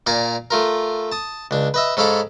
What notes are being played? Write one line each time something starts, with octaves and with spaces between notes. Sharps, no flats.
A#2 D5 F5 G#5 A#5
A3 F4 A#4
A5 D#6
C#2 D4
B4 D#5 E5
G#2 C#4 A4 F5 B5 D6